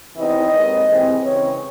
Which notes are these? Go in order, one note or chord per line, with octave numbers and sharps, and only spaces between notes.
E2 C3 E3 C4 D#4 D#5
D#2 D#3 G#3 C4
C3 E3 G#3 C4
C#3 E3 C4 C#5